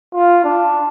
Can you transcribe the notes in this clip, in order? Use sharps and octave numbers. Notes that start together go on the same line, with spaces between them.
F4
D4